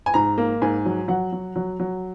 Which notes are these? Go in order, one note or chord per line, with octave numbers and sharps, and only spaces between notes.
G#5
G#2 A#5
A#3
G#2 G#5
F#3
F#3 F#5
F#3
F#3
F#3